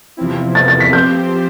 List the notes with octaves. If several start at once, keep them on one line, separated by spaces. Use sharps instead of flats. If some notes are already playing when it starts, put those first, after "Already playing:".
E2 C3 F3 C4 E4
A6
A6
B6
F3 C4 G4 C5 G6